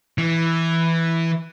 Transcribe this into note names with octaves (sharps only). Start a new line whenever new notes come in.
E3